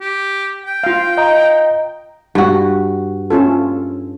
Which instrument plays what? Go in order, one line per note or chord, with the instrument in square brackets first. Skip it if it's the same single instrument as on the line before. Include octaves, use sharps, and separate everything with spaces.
[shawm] G4
G5
[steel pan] F4 F5
[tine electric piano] D#5 A#5
[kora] G2 F#4
[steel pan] C#4 F4 A4